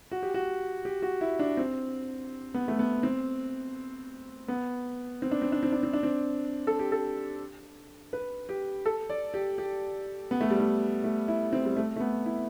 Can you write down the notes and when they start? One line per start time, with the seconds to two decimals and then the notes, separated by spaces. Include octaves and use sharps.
0.11 F#4
0.22 G4
0.34 F#4
0.85 G4
1.02 F#4
1.21 E4
1.39 D4
1.57 C4
2.54 B3
2.68 A3
2.79 B3
3.03 C4
4.48 B3
5.22 C4
5.31 D4
5.42 C4
5.52 D4
5.63 C4
5.72 D4
5.83 C4
5.93 D4
6.03 C4
6.67 A4
6.79 G4
6.92 A4
8.13 B4
8.49 G4
8.85 A4
9.10 D5
9.34 G4
9.58 G4
10.31 B3
10.40 A3
10.50 G3
10.60 A3
11.04 A3
11.28 E4
11.53 C4
11.65 G3
11.76 A3
11.96 A3
12.00 B3
12.25 E4